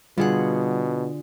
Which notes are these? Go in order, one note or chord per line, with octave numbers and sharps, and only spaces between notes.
B2 D3 G3 F4 G#4 F#5